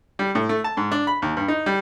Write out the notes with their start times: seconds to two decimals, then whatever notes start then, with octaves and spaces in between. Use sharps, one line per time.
0.19 G3
0.35 A2
0.49 A3
0.64 A5
0.77 G#2
0.91 D4
1.07 B5
1.22 D#2
1.37 G2
1.48 D#4
1.66 G3